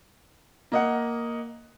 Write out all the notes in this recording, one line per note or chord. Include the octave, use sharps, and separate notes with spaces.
A#3 D#5 F#5